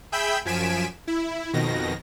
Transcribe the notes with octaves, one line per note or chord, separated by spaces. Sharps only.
G#4 E5 G5 B5 E6 G6
F#2 F3 G#5 B6 D7 E7
E4
F2 B2 D#3 A#6